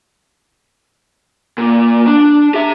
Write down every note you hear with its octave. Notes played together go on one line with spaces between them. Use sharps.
A#2
D4
G4 E5